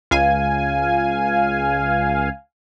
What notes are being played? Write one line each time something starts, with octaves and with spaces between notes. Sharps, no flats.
C#2 F5 G#5